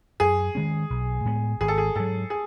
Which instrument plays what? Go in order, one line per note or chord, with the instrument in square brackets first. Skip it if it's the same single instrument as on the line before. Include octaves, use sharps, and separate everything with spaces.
[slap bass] F#2 [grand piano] G#4
[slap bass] D#3 G#3 C#4
B1
A2 G#3 B3
[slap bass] G#1 [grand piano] G#4
[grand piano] A4
G#4
[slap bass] G#2 F#3 [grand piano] A4
[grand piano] G#4